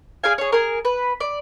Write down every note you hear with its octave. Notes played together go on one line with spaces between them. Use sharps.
G#4 D5 F5 G#5
G#4 C#5
G#4 A#4
B4
D5